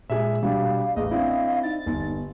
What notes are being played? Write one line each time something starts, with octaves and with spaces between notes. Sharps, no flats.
A#2 G#3 G#4 E5
B2 G3 D4 F5
A1 G#4 D#5
C4 D4 E4 F5
D#4 A6
G1 D#4